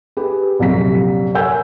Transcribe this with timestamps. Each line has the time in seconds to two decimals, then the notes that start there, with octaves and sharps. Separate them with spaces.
0.17 G4 G#4 B4
0.59 A#1 F#2 C3 B6
1.34 A#4 C#5 F#5 G#5 E6 G6